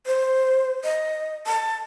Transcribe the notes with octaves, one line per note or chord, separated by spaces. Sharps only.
C5
D#5
A5